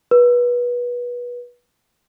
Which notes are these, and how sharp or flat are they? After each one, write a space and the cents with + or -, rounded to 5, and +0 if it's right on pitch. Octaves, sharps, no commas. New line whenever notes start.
B4 -25